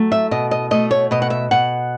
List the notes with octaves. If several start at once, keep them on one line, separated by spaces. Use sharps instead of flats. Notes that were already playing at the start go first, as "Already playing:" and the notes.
Already playing: F#3 A3
E5
B2 D#5
D#5
A3 D#5
C#5
B2 D#5
F#5
E5
B2 F#5